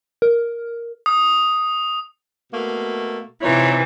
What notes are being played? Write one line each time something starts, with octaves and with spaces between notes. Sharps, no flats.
A#4
D#6
B2 A3 A#3
C3 E3 D#4 F4 C#5